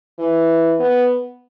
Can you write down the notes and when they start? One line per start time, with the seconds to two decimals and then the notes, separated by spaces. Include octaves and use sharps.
0.19 E3
0.79 B3